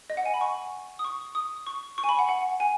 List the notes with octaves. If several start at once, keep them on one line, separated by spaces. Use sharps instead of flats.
D#5
F#5
G#5
B5
C#6
D#6
C#6
D#6
C#6
C#6
G#5
B5
F#5
F#5
G#5